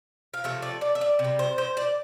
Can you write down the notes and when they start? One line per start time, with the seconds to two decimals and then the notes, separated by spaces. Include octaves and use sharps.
0.34 F5
0.44 C3 F3 A3 E5
0.62 D5
0.81 D5
0.95 E5
1.01 D5
1.19 C3
1.24 G3
1.39 C5
1.58 C5
1.77 D5